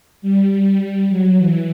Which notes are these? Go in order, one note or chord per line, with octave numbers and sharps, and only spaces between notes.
G3
G3
F#3
E3